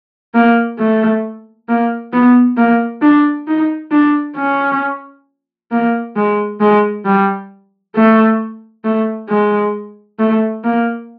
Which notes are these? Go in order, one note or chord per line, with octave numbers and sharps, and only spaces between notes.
A#3
A3
A#3
B3
A#3
D4
D#4
D4
C#4
A#3
G#3
G#3
G3
A3
A3
G#3
A3
A#3